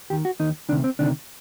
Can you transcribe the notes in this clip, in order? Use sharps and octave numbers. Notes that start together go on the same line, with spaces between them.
D#2 D#3 G4
F#4
D#2 D#3 D#4
D2 C3 D#3 D4
C4
D2 C3 D#3 D4